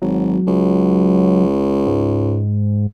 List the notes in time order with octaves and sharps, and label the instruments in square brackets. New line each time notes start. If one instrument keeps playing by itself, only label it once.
[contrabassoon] G#1 [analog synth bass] F#3
[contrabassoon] C#2
[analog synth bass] G#2